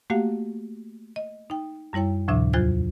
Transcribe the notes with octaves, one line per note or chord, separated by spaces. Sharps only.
A3 A#3 F#4 G4 F5 F#5
D#5
D#4 G5
F#2 G3 E4 C#5 G5
D2 A2 C3 F3 D4 E5
E2 F#3 F4 C5 F#6 G#6